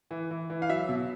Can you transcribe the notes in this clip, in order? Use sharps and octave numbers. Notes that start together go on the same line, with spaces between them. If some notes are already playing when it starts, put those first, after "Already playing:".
E3
E3
E3
F5
F#3 E5
B2